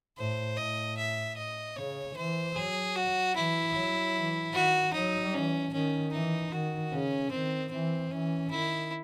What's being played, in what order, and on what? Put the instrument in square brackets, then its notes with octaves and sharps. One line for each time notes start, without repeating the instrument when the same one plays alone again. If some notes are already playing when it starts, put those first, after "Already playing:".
[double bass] A2 [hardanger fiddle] C5
[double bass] A2 [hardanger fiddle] D#5
[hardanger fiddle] E5
D#5
[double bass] C#3 [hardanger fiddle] C#5
[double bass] E3 [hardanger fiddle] C5
[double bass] F#3 [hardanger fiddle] G#4
[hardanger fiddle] F#4
[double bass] E3 [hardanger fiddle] E4
[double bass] F#3
E3
[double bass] D#3 [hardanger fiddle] F#4
[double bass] F#3 [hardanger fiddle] D#4
[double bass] E3 [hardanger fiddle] C#4
[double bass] D#3 [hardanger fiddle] C#4
[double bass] E3 [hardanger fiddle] D#4
[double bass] D#3 [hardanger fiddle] F#4
[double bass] C#3 [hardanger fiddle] C#4
[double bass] D#3 [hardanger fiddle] C4
[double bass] E3 [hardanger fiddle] C4
[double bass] E3 [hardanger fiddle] C#4
[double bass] D#3 [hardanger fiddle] E4